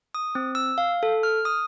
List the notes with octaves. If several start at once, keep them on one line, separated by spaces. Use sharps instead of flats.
D#6
C4
E6
F5
A4
F6
D#6